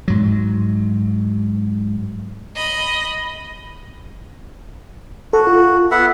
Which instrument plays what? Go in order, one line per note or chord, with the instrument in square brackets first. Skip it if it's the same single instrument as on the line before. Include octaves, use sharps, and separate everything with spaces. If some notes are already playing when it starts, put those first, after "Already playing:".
[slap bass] G#2 F#3
[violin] D#5 B5
[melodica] F#4 [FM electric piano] A4
[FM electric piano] F4
[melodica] B3 E5 F#5